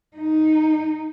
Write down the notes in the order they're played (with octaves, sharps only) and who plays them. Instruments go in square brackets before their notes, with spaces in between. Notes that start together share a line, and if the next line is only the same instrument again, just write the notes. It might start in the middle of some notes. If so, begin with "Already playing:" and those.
[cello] D#4